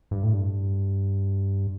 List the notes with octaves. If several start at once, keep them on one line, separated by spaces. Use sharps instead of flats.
G2
A2
G2